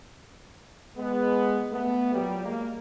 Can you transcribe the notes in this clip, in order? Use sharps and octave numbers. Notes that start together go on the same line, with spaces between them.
G#3 B3
A3 B3
A#2 F#3 G3
G3 G#3 A#3